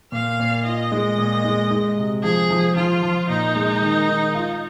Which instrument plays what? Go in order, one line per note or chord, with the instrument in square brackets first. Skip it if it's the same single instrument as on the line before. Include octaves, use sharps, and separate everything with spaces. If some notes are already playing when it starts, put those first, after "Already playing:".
[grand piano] A#2 [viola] F5
[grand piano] A#2
[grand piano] F4 [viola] D#5
[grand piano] G#3
A#2
G#3
G#3
C3
[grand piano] F3 [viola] G#4
[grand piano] F3
[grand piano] F3 [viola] F4
[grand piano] F3
[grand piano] A#2 [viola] D#4
[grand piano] G#3
D#3
D#3
F4